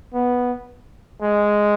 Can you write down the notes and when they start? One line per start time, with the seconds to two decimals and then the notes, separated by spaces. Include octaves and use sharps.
0.14 B3
1.22 G#3